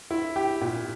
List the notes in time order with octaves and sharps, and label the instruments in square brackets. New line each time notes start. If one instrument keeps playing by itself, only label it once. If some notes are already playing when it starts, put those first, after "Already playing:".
[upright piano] E4
G4
A#2